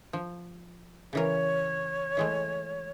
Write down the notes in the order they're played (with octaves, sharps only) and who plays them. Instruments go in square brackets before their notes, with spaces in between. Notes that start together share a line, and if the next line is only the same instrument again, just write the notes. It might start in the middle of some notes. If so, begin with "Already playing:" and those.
[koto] F3
[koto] C#3 E3 A#4 [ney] C#5
[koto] E3 G#3 A3